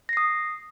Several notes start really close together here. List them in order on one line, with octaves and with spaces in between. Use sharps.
A#6 C7 D#6